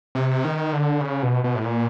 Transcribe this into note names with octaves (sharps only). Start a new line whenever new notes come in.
C3
D#3
D3
C#3
B2
B2
A2
A#2